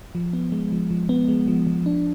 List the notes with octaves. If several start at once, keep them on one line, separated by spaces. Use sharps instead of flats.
F3
B3
G#3
F3
F3
B3
G#3
F3
F3
D4